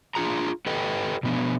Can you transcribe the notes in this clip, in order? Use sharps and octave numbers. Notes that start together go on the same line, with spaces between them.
D4 F4 G#4 A#5
G4 A4 B4 D#5 G5
B2 F3 B3 D4